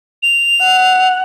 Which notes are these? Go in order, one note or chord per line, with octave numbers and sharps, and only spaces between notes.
F7
F#5